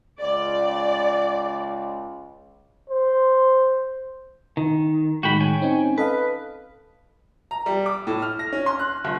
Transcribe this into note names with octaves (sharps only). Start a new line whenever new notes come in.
C#2 D5
C5
D#3
A2 D#3 G#3 F#4 G5 B5
C#5 G5 G#5
C4 C#4 D#4
A4 B4 D#5 F5
A#5
G3
D6
A2
F6
A#6
C#4
C6
F#6
G1